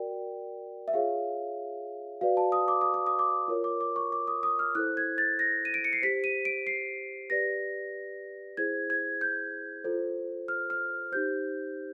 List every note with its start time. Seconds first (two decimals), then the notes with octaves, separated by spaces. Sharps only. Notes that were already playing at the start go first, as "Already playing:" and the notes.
Already playing: F#4 A#4 D5 G5
0.88 E5
0.93 F4 G#4 C#5 F5
2.21 F#4 B4 D5 F5
2.37 A5
2.52 D#6
2.68 D6
2.81 D#6
2.94 D6
3.07 D#6
3.19 D6
3.48 F4 A#4 C#5
3.64 D6
3.81 D6
3.96 C#6
4.12 D6
4.28 D#6
4.43 D#6
4.59 F6
4.75 E4 A4 C5 F#6
4.97 G#6
5.18 A6
5.39 A#6
5.65 D#7
5.74 D7
5.84 C#7
5.93 C7
6.02 G4 C5 B6
6.24 D#7
6.45 D7
6.67 C7
7.30 G4 B4 D5 A#6
8.57 E4 G#4 C5 G#6
8.90 G#6
9.21 G6
9.84 F4 A4 C5
10.48 F6
10.70 F6
11.12 D#4 G4 C5 G6